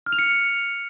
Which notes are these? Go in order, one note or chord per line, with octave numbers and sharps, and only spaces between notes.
F6
F7
C#7